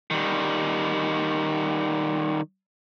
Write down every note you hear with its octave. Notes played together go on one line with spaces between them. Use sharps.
D#3 G3